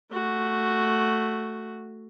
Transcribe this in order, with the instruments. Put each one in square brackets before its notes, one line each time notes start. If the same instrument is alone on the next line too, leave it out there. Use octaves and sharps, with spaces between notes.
[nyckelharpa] A3 F#4